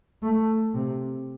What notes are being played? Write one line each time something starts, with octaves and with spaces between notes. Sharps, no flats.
A3
C3